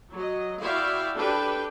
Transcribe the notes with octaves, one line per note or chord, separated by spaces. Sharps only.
F#3 D#5
E4 F#4 D5 E5 F5 G5
D4 G4 A4 B4 G5